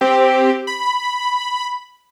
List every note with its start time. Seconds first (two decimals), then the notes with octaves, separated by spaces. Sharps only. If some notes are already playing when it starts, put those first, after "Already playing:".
0.01 C4 G4
0.67 B5